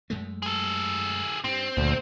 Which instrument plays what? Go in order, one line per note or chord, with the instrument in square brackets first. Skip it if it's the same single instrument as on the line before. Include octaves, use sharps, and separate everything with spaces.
[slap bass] F#2 G#3 A3
[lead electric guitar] G#4 A4
[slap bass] G2 [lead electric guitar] C4
[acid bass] D2 [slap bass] A#2 A3